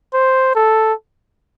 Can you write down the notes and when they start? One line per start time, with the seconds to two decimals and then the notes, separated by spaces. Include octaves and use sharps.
0.14 C5
0.55 A4